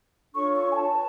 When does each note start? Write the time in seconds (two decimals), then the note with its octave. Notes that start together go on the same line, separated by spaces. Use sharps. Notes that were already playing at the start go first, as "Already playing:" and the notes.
0.34 D4 F4 A4 C#5 C#6
0.54 C#6
0.69 G#5
0.74 A5
0.93 B4